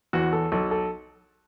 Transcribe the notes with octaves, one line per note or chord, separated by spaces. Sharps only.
E2 E3 F#4
A4
B1 A4
A4